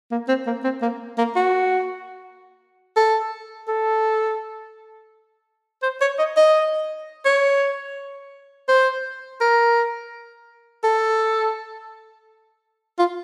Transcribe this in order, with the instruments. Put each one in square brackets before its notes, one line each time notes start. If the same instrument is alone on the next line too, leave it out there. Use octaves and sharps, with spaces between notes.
[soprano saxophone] A#3
C4
A#3
C4
A#3
A#3
F#4
A4
A4
C5
C#5
D#5
D#5
C#5
C5
A#4
A4
F4